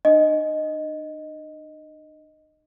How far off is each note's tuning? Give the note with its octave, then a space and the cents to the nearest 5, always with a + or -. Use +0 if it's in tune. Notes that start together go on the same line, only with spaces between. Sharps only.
D4 +45 D#5 +0